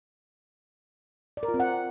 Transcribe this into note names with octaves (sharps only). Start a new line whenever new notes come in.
D5
A#4
F4
C4
F#5